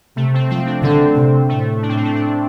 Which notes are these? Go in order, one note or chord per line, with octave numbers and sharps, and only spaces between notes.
C3 A3
C4
F3 C4
D4
D3 C4
C3
A2 A3
D4
C4
A3
C4
D4